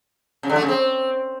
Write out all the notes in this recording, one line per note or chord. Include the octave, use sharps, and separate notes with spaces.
C#3
D3
A3
C#3
C4